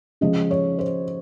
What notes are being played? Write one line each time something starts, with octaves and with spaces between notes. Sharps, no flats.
C#3 F3 G#3 D#5
C#5
C5